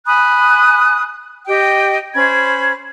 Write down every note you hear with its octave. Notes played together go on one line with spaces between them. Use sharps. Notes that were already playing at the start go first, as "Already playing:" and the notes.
G#5 B5 D#6 F#6
G4 D#5 G5
C#4 C5 B5 G#6